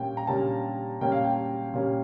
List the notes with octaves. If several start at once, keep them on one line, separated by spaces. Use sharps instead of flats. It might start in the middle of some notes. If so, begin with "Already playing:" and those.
Already playing: A#2 G3 A#3 C#4 G5
A#5
A#2 G3 A#3 C#4 A5
A#2 G3 A#3 C#4 G5
F5
G5
A#2 G3 A#3 C#4